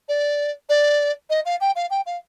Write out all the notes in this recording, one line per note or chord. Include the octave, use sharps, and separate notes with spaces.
D5
D5
D#5
F5
G5
F5
G5
F5